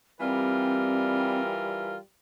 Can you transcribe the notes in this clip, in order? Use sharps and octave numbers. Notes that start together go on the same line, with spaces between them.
E3 G3 C4 F4 A#4